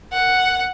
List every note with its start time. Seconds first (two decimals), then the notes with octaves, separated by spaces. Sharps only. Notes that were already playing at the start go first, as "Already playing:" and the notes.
0.13 F#5